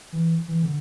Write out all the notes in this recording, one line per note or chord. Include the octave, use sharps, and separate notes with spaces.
E3
E3
D3